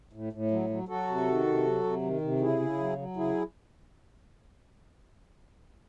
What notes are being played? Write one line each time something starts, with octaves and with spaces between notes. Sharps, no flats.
A2
A2
F#3
F#3
F#3 F#4 A4
C3
D#3
C3
F#3
C3
D#3
C3
C#3 E4 G#4
C#3
F#3
F#3
C#3 E4 G#4